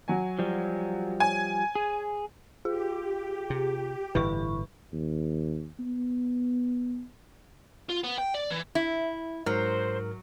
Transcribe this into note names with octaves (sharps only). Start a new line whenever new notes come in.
F#3 F#4 G#5
F3 G3
C#5 G#5
G#4
F4 G4 G#4
C3
G1 A2 E3 E4 B4 C#6
D#2
B3
F4
B3
G5
D5
E3
E4
G#2 F#3 A#4 C5 F6